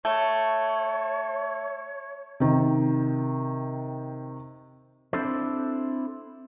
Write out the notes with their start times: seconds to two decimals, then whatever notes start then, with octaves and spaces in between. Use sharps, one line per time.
0.05 A3 C#5
2.40 C3 D#3
5.13 C4 D4 E4 A4 C5